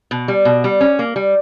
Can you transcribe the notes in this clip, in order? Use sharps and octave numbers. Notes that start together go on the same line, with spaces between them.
B2
G3
B2
G3
C#4
A#3
G3